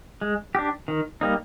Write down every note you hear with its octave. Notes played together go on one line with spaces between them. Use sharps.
G#3
D4 G4
D#3
G3 A#3 D#4